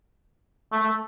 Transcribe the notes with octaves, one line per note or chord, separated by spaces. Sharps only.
A3
A3